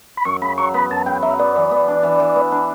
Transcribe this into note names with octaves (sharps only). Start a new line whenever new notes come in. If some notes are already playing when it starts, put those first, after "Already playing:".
B5
F#2 C#6
C#3 B5
F#3 C#6
B3 B5
F#2 A5
C#3 G5
F#3 E5
B3 D5
E3
B3
D4
E3
E3
B3
D4